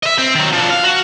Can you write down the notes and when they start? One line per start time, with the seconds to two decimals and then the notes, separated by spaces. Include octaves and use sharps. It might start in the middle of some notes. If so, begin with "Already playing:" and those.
0.03 D#5 E5
0.18 C4
0.35 D#3 F#3
0.52 F3 D4
0.70 F5
0.84 F#4